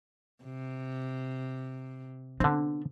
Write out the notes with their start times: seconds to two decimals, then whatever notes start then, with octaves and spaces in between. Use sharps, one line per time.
0.44 C3
2.40 D3 B3 C4 D4